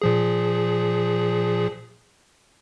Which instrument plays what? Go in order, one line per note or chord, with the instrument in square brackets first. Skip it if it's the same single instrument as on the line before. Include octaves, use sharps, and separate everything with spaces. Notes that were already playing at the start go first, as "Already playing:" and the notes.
[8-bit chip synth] A#2 F3 G#4